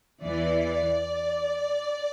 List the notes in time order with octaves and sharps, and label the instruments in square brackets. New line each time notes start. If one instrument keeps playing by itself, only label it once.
[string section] E2 E3 D5